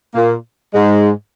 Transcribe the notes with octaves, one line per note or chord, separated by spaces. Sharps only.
A#2 A#3
G#2 G#3